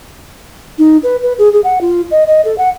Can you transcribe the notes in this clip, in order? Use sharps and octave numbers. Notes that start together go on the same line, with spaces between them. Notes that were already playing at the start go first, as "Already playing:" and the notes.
D#4
B4
B4
G#4
G#4
F#5
F4
D#5
D#5
A4
F#5